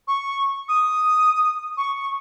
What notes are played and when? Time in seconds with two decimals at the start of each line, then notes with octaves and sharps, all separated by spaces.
0.07 C#6
0.68 D#6
1.77 C#6